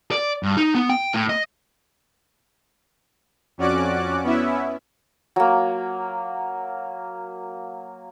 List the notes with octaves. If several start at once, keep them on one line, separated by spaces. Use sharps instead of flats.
D5
G2
D#4
B3
G5
A2
D#5
F2 C#4 F#4 D5 D6 F#6
B3 C#4 E4 E5
F#3 A#3